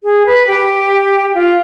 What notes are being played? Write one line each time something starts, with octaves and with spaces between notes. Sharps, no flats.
G#4
B4
G4
F4